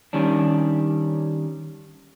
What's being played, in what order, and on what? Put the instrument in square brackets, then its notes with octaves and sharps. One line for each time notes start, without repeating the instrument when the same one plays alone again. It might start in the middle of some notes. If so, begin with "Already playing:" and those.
[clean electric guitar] D#3 G3 C#4 D4